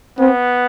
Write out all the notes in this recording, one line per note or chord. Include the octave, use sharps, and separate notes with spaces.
B3 C4